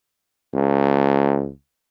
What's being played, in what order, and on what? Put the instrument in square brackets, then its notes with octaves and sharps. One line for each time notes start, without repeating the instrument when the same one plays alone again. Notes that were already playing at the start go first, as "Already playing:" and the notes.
[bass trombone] C#2